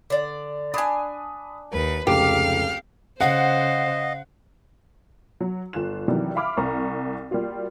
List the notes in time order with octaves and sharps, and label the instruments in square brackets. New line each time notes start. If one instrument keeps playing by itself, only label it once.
[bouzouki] D3 D5
[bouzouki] D4 G#5 [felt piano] B5 D#6
[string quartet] D#2 B4 [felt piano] A#4
[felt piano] F1 C#2 [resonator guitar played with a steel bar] G4 [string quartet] F5 F6
[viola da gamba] C#3 C5 [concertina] D#5 [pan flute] F5 [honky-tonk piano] F#5
[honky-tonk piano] F#3
G1 F4 F#6 E7
C3 D#3 E3 F#3 G3
E5 F5 B5 D6 F6
C2 A#5 C#6
G3 A#3 F4 F#4